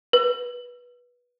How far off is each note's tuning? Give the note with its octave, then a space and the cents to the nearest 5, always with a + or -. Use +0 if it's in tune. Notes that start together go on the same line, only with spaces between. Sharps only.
B4 -15